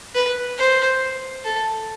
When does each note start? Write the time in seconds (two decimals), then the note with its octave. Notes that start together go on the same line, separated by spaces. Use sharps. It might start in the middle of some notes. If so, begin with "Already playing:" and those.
0.15 B4
0.58 C5
1.45 A4